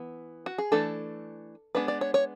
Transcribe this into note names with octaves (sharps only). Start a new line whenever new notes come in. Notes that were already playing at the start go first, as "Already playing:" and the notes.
Already playing: E3 B3
F#4
G#4
E3 A3 D4 A4
G#3 B3 D4 B4
D5
C#5
C#5